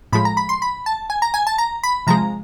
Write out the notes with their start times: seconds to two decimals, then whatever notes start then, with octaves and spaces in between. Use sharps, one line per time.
0.13 A2 F3 G#3 B5
0.25 A#5
0.37 B5
0.49 C6
0.62 B5
0.86 A5
1.10 G#5
1.22 A#5
1.34 G#5
1.47 A5
1.58 A#5
1.84 B5
2.07 C3 F3 G#3 A#5